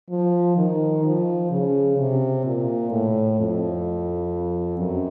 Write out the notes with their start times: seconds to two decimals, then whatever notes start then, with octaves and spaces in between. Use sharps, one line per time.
0.10 F3
0.57 D#3
1.04 F3
1.50 C#3
1.98 C3
2.45 A#2
2.91 A2
3.39 F2
4.79 F#2